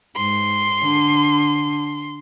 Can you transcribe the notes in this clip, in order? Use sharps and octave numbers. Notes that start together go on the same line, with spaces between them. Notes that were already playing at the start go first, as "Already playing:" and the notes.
G#2 C6
D3